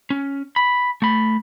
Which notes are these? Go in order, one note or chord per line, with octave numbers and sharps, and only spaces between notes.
C#4
B5
A3 B5